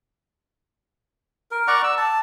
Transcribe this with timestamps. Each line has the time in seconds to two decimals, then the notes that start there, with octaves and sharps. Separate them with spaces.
1.51 A#4
1.68 D5 F#5 A#5 C#6
1.84 E6
1.97 A5